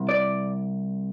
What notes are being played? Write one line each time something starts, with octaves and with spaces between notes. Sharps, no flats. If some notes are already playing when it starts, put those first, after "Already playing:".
Already playing: C2
D5